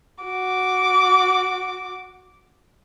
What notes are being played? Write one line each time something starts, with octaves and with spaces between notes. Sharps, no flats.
F#4 D6